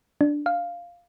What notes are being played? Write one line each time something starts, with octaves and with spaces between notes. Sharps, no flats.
D4
F5